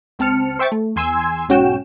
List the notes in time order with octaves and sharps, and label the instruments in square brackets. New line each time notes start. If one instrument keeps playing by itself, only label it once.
[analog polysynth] C#2 C4 A5 F6 C#7
C5 E5 G5 C#6 A6
A3
E2 G#5 C6 E6 G#6
B1 G#2 C#4 F#4 G5 E7